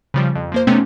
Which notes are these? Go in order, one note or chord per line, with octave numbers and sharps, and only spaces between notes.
C#3 F3 G3
F2
F3 A#3 C5
C3 A3 B3 C#4 D#4